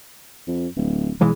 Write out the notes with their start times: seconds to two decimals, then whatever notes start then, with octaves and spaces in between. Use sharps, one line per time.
0.47 F2
0.76 D1
1.21 B1 E3 G#3